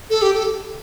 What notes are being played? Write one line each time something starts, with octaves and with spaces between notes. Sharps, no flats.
A4
G4
A4